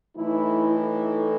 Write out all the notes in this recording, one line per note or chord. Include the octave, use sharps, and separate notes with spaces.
A2 E3 A3 D#4 E4
E4